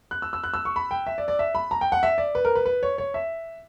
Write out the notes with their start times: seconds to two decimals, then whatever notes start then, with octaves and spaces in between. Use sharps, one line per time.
0.11 F#6
0.22 E6
0.33 E6
0.44 F#6
0.54 E6
0.65 C#6
0.76 B5
0.91 G5
1.07 E5
1.18 D5
1.28 D5
1.39 E5
1.55 B5
1.71 A#5
1.81 G5
1.92 F#5
2.03 E5
2.18 D5
2.35 B4
2.45 A#4
2.55 B4
2.66 B4
2.83 C#5
2.98 C#5
3.14 E5